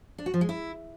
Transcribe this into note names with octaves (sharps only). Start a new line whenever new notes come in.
D4
F#4
F3
G#3
E4